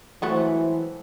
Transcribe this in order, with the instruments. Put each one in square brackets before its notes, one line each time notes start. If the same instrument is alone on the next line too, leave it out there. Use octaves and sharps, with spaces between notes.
[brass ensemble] E3 [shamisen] F#3 A3 F#4 [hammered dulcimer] G#3 C4 A4